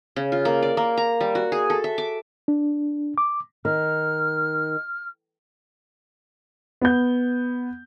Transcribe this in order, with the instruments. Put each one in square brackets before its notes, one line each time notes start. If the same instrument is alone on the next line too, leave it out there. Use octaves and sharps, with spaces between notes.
[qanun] C#3
F4
A#3
D5
A#3
A#5
G3
F#4
G#4
A4
E5
D6
[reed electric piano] D4
D6
[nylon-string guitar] D#3 [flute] F6
[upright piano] B3 G6